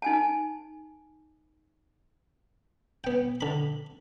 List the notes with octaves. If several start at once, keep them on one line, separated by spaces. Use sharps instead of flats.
D#4 G#5 A5
B3 G5
D3 B5